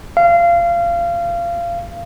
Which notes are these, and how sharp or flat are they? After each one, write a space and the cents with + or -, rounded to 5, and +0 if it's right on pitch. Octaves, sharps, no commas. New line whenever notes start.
F5 -25